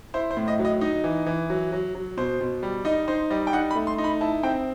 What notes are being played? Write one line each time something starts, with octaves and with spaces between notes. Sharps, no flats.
E4 C5
C5
A2
D#5
F#3
D#5
D#4 D#5
E3
E3
F#3
F#3
F#3
B2 C5
B2
G3
D#4 D#5
D#4 C5
G3 D#5
G5
D#4 F#5
B5
A3
C6
D#4
B5
E4 A5
C4 G5